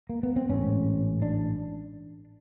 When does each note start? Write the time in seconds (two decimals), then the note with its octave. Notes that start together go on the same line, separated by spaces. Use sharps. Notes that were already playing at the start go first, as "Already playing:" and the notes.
0.09 A#3
0.23 B3
0.36 C4
0.49 A1 G#2 C#4
1.22 D4